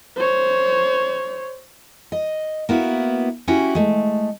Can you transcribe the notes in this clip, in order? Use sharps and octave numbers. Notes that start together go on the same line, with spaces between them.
C5 C#5
D#5
A#3 B3 E4 F#4
C#4 E4 F#4 G4
G#3 A3